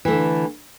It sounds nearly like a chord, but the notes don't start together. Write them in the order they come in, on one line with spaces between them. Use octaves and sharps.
E3 A3 D3